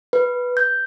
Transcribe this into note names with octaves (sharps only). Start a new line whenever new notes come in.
B4
G6